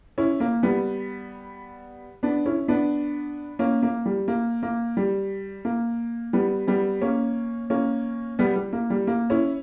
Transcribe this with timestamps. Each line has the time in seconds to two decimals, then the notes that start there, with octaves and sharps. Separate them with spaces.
0.18 C#4 E4
0.40 A#3
0.63 G3 B3
2.23 B3 D4
2.46 C#4 E4
2.68 B3 D4
3.59 A#3 C#4
3.83 A#3
4.06 G3
4.28 A#3
4.63 A#3
4.97 G3
5.65 A#3
6.33 G3 B3
6.67 G3 B3
7.01 A#3 C#4
7.70 A#3 C#4
8.39 G3 B3
8.56 G3
8.73 A#3
8.90 G3
9.07 A#3
9.30 C#4 E4